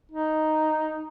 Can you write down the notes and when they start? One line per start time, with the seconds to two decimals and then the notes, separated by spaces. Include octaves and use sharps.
0.12 D#4